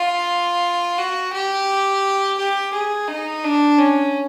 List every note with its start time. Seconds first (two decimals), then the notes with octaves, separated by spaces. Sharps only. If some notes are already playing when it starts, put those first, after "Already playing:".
Already playing: F4
0.98 F#4
1.33 G4
2.38 G4
2.73 G#4
3.08 D#4
3.44 D4
3.78 C#4